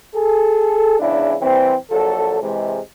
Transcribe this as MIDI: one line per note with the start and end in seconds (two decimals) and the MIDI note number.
0.14 0.96 68
0.14 0.96 69
1.00 1.34 40
1.00 1.34 44
1.00 1.34 49
1.00 1.34 62
1.00 1.34 64
1.41 1.74 52
1.41 1.74 55
1.41 1.74 60
1.91 2.39 34
1.91 2.39 54
1.91 2.39 69
2.41 2.79 48
2.41 2.79 52
2.41 2.79 56